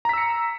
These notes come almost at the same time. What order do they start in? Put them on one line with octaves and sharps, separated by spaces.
A#5 B6 E6 C#7